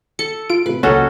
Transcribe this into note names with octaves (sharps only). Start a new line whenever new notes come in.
A4 C#7
F4 D7
A2 C3 B4
C#2 A#2 F#3 C#4 F#4 A4 D#5